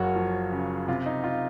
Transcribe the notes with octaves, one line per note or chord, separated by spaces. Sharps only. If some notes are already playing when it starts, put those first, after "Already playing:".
Already playing: F#1 F#2 F#4 C#5
F3
C#3
C3 F4
D#4
F4